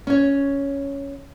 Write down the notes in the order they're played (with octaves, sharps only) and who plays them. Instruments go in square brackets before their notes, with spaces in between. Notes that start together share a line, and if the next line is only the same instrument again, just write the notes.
[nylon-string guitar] C#4 C#5